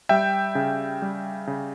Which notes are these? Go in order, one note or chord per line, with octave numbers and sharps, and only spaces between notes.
G3 E5 G5
C#3
G3
C#3